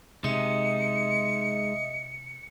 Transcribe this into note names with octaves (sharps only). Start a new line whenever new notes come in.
C3 G#3 D#4 D#5 E5 D#6 C#7